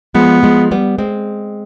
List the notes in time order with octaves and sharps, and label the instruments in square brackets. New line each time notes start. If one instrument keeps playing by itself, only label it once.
[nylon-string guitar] F3 G#3 [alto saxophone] B3
[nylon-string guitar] F3 G#3
G3 B3
G#3 C4